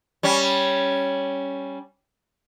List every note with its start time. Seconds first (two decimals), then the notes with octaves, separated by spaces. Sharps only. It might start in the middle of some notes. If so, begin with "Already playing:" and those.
0.23 G3 C#4